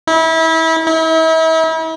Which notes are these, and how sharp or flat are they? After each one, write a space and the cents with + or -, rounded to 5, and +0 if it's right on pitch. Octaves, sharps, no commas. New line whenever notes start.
E4 -30
E4 -40